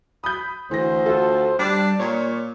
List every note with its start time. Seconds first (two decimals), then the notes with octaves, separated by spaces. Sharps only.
0.24 B5 D#6 G6
0.71 D2 E3 C5 A#6
1.06 F4 F#4 A4
1.59 G3 D4 D5 D6
1.99 A#2 C#5